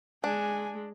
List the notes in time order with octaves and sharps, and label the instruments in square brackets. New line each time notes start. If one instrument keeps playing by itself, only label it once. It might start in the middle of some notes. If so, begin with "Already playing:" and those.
[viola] G#3 [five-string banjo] D4 [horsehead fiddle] G#5